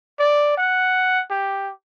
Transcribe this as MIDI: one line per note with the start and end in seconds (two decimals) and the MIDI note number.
0.19 0.53 74
0.57 1.23 78
1.30 1.71 67